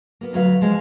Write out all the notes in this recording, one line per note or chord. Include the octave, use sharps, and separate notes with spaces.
A#3 B3
D2 F#3 B4 F5
F3 G#3 D#5 F5